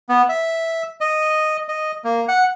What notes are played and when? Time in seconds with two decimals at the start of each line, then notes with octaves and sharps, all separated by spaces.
0.09 B3
0.29 E5
1.01 D#5
1.69 D#5
2.04 A#3
2.28 F#5